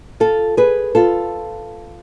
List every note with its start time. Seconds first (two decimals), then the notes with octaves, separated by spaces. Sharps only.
0.20 F4 A4
0.57 G#4 B4
0.95 F4 A4